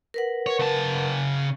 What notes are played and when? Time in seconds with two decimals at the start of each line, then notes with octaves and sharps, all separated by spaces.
0.14 A#4 B4 F#5
0.46 C#5
0.59 C#3 A5